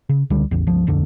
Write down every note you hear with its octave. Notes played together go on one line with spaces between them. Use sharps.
C#3
C#2 D3 G3
A1 E2
G1 C#2 F3
D1 A#1 F2 D3